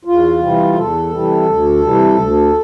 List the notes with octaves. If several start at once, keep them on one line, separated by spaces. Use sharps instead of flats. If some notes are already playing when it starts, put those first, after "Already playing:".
E2 F4
C3 E3 G3
E2 A4
C3 E3 G3
D2
C3 E3 G3
D2